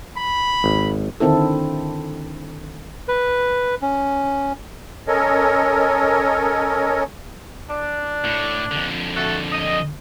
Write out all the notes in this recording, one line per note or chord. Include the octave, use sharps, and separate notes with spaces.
B5
G#1
D3 D#3 C4 E4 A4
B4
C#4
C#4 A4 A#4 C#5 D#5
D4
A2
F2 D3
A3 F#4 A4
D#5